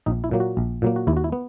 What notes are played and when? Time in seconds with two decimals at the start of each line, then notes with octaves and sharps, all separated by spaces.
0.06 A#1 D#4
0.24 E4
0.31 A#2 F#3 A#3
0.40 F#4
0.57 A#1
0.82 A#2 F#3 A#3
0.96 F#4
1.07 D#2 E4
1.17 F#4
1.24 E4
1.32 B3